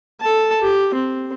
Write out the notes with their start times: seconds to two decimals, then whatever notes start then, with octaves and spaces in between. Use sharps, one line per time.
0.21 A4 A5
0.62 G4
0.95 C4